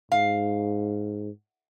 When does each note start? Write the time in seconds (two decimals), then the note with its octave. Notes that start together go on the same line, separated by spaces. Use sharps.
0.12 G#2 F5